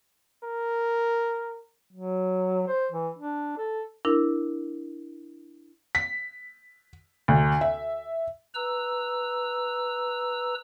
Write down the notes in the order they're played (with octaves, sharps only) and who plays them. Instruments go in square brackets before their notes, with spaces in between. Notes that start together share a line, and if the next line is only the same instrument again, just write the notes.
[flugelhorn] A#4
[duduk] F#3
C5
E3
D4
A4
[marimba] D4 E4 A#4
[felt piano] B6
D2
E5
[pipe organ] B4 A#5 E6